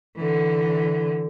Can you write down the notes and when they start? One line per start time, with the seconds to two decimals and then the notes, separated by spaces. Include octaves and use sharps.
0.16 D3 E3